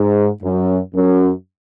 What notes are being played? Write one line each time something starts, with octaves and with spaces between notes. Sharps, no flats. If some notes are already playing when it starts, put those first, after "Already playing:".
Already playing: G#2
F#2
F#2